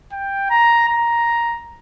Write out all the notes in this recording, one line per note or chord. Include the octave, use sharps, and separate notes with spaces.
G5
A#5
A#5